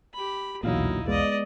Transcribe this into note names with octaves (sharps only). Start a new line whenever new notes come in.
G4 B5
B1 E2 A#2 D3 F#3 D#4 E4 F5
G#3 B3 D5 D#5